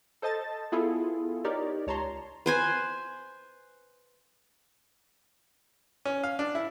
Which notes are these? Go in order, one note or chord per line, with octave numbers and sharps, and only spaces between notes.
A4 C5 D#5 A5 A6
B3 E4 F4 G#4 A4
D#4 G4 A#4 C#5 D5
C#2 C#5 A5 A#5 C6
B4 C5 G#5
C#4
F5
D4
E4